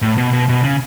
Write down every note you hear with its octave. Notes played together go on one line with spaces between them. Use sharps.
A2
B2
B2
B2
C#3